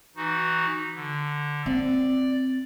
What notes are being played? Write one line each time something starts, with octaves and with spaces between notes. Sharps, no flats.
E3 D#4 F#4
D3
C4 D5